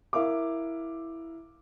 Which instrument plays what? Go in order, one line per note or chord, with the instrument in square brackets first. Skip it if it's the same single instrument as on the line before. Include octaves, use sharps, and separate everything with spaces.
[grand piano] E4 A#4 E5 F5 D6